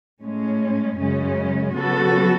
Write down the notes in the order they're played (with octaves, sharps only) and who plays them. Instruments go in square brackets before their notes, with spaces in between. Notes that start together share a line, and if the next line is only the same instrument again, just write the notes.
[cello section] A2 G#3 C#4
F#2 C#3 G#3 C#4
C#3 F#3 B3 F#4 A4